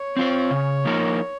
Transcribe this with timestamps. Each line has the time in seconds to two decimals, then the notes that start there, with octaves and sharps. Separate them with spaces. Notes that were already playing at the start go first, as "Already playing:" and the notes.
Already playing: C#5
0.17 C4 F4 C5
0.51 C#3
0.85 F3 A#3 D#4 A#4